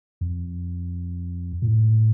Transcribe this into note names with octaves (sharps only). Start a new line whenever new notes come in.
F2
A#2
A2